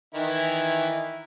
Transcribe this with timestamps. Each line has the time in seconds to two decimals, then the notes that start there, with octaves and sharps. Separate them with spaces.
0.14 D#3 E3 E4